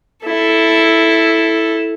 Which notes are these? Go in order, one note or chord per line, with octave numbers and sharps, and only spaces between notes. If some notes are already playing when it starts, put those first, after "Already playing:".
E4 A4